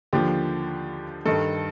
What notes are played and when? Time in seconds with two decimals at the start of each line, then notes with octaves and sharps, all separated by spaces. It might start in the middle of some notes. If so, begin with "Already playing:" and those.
0.13 D#2 D3 F3 G4
1.26 G2 D#3 A4